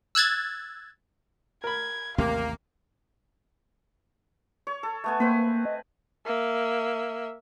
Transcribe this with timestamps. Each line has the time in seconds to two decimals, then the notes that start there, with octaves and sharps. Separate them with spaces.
0.15 E6 F#6 G#6 A6
1.64 A#4 B5 G#6
2.18 A1 D#2 C3 A3 A#3 F5
4.67 C#5
4.83 A4
5.04 A3 B3 G#5
5.20 A#3 C4 B4
5.65 D#5
6.25 A#3 E5